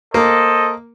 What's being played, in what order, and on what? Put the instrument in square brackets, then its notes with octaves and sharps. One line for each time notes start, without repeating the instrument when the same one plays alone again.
[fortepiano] A#3 [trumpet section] A4 C5 D#5